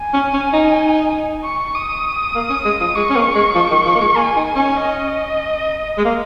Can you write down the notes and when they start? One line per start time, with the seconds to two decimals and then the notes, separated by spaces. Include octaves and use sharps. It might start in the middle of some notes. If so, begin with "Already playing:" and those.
Already playing: G#5
0.14 C#4
0.34 C#4
0.53 D#4
1.44 C#6
1.75 D#6
2.35 A#3
2.49 C#4
2.65 G#3
2.81 F3
2.95 G#3 C#6
3.10 C#4
3.16 A#3
3.35 G#3
3.55 F3
3.71 D#3
3.85 F3
3.95 A#3
4.01 G#3
4.16 A#3 G#5
4.36 D#4
4.47 G#5
4.56 C#4
4.77 D#5
5.98 G#3
6.05 A#3